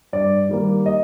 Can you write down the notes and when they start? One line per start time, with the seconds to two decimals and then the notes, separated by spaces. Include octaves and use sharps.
0.13 G2 D5
0.49 D#3 G3 A#3
0.86 D#5